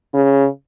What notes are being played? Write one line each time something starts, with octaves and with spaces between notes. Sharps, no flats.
C#3